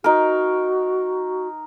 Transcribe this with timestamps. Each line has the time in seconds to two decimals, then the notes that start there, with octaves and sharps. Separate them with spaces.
0.04 D#4 F#4 A#4